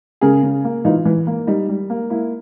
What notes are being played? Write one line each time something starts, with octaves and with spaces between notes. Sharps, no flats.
C#3 G#4 A#4
C#3
A#3
E3 D#4 F4
E3
A#3
G3 D#4
G3
A#3
A#3 E4